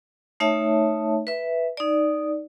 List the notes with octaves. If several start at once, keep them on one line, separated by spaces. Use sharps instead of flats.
A3 D#4 C#5 E5 A5
B4 E5
D#4 D5